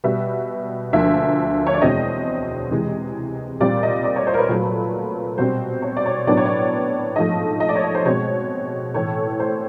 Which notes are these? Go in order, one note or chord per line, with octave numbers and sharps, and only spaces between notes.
B2 G3 B3 E5
D2 D3 F3 A#3 E5
C#5
D5
E2 B2 G#3 C4 D#5
C3 E3 G#3
A#2 G3 C4 D5
D#5
D5
C#5
C5
A#4
B4
A#2 F#3 A3
B2 G3 C4 C5
C#5
D5
C#5
A2 F#3 B3 D4 D5
C#5
D5
G#2 F3 A3 D#5
D#5
D5
C#5
D5
C5
B2 G#3 C4 C#5
A2 E3 A3 C#5
C5